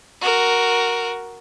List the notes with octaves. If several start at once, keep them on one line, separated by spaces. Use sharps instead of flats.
F#4 A#4